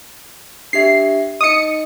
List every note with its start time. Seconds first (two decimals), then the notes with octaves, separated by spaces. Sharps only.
0.73 D4 G4 E5 C7
1.41 D#4 D#5 D#6 C#7